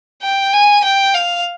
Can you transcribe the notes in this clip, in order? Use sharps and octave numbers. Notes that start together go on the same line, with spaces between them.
G5
G#5
G5
F5